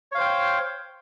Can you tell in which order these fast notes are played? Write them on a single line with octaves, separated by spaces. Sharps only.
C#5 F5 C5 G5